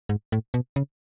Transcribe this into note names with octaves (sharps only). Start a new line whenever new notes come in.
G#2
A2
B2
C#3